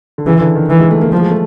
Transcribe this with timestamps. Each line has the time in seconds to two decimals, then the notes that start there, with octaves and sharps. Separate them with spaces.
0.18 D3
0.26 C#3 E3
0.41 D3
0.55 D#3
0.70 E3
0.80 G#3
0.91 A3
1.01 A#3
1.12 F3 A3
1.21 G#3
1.31 A3